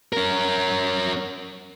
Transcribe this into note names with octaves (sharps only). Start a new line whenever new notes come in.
C#4 A#4